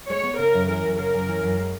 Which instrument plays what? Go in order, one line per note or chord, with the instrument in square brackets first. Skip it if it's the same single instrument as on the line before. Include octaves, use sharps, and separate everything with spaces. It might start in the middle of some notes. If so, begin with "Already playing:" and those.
[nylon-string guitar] G#3 [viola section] C#5
[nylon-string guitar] B3
[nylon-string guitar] C#3 [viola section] A#4
[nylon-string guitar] F#2
[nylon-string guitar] E3 [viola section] A#4
[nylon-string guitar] F#2
[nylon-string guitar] C#3 [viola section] A#4
[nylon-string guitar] F#2
E3
F#2
G#3